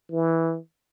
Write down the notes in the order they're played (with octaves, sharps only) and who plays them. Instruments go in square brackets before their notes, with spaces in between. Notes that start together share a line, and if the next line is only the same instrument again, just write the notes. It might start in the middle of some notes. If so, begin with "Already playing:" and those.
[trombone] E3